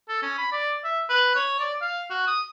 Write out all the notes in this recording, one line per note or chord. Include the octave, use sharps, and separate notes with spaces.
A4
C#4
B5
D5
E5
B4
C#5
D5
F5
F#4
D#6